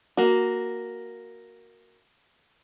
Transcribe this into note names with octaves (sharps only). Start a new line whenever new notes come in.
A#3 F#4